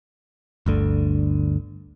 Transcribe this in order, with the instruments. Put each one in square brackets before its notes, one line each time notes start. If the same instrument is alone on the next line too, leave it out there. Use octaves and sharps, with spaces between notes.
[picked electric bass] G1 D2 D3